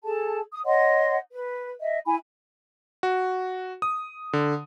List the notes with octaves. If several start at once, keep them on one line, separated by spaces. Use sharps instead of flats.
G#4 A4 A5
D#6
C#5 D#5 F#5 C6
B4
D#5 E5
E4 G#5 B5
F#4
D#6
D3